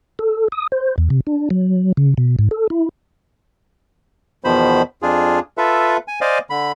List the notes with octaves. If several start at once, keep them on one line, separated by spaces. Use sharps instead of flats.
A4
D#6
C5
E2
C3
D4
F#3
C#3
B2
G#2
A4
E4
E2 B2 D#3 F3 C5 B5
F2 D4 F4 G#4
F4 A4 B4 E5
G#5
C5 D5 D#5 F5 G#5
D3 B5